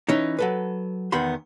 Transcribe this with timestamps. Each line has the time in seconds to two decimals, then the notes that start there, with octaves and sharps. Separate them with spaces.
0.09 E3 C#4 D#4
0.39 F#3 A4 B4
1.12 E2 D#3 B3 B5 C6